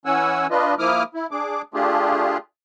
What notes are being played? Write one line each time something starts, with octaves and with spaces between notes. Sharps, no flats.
E3 C#4 F#5 G#5 E6
D4 F4 B4 D#5
F3 A#3 E4 D6 D#6 F6
E4
D4 G#4 D6
A3 D4 F4 G4 G#4